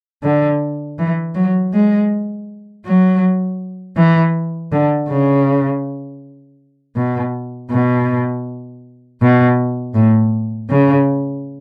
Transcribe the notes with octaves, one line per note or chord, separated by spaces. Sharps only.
D3
E3
F#3
G#3
F#3
E3
D3
C#3
B2
B2
B2
A2
C#3